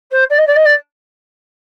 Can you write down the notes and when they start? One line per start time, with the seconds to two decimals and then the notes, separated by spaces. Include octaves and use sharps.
0.11 C5
0.30 D5
0.38 D#5
0.47 D5
0.56 D#5
0.65 D5